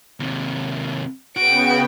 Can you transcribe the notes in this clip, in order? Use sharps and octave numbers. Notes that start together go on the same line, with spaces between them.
D#2 C3
C#3 B3 F#4 G5 D7